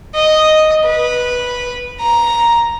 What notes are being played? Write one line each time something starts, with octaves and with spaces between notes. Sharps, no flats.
D#5
B4
A#5